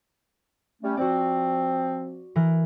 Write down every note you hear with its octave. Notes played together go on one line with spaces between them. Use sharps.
G3 A3 C#4
F3 C4 F#4 D5
E3 A#4 F#6